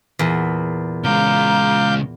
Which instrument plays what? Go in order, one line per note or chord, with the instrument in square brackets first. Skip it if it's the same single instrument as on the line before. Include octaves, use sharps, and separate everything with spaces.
[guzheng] E2 A#2
[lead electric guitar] C#3 G#3 [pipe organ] F5 D6 G6 [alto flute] A#5